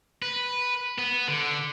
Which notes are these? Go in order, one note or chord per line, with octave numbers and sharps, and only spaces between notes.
B4
B3
D3